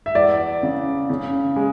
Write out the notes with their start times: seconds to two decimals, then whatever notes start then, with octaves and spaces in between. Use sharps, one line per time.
0.06 E5
0.15 E2 D5
0.63 C#3
1.10 C#3
1.56 G#3